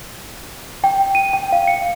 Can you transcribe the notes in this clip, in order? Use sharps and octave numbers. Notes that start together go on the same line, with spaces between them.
G5
D#7
G5
F5
C#7